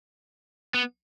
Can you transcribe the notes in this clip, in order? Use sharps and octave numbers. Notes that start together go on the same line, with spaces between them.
B3